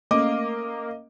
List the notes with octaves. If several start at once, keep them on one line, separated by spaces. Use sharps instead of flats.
A3 A#3 C#4 D#5 D6